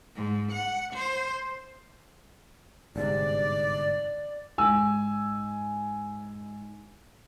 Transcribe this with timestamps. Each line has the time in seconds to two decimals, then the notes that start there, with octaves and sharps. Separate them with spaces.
0.15 G#2
0.52 F#5
0.93 C5
2.96 G1 G#2 C3 D5
4.58 G#2 G#5 E6